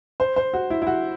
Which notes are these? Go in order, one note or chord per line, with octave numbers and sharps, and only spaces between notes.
C5
C5
F#4
E4
E4
F#4